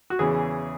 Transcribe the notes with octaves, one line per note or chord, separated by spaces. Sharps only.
F#4
E2 C#3 E3 G#4